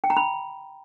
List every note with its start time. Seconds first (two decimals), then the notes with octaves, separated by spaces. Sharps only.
0.04 G5
0.10 A#5
0.17 B5